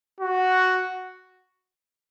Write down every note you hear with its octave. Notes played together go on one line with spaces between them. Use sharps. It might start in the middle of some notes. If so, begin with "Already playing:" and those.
F#4